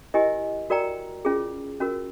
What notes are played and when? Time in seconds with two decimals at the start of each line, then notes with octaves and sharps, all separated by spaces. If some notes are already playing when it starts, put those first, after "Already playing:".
0.14 E4 G4 A#4 D#5 G#5
0.70 F#4 A#4 D5 G5 A#5
1.25 C#4 F4 G#4
1.80 C#4 F#4 A#4